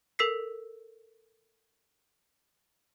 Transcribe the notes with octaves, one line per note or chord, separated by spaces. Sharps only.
A4 A#4 E6 B6 C7